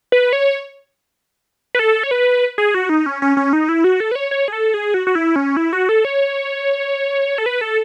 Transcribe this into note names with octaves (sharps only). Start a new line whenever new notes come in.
B4
C#5
B4
A4
C#5
B4
G#4
F#4
D#4
C#4
C#4
C#4
D#4
E4
F#4
A4
B4
C#5
C#5
G#4
A4
G#4
F#4
F#4
E4
C#4
E4
F#4
A4
C#5
A4
B4
A4